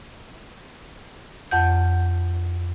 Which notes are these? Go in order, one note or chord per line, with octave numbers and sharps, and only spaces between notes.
F2 F#5 G6